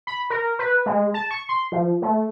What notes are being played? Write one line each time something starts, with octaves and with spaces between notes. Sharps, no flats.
B5
A#4
B4
G#3
A5
C#6
C6
F3
A3